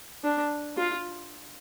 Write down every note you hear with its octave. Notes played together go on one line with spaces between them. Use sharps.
D4
F4